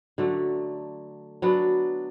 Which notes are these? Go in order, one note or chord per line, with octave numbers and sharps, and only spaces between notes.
D3 F#3 A3 D4
F#3 B3 D4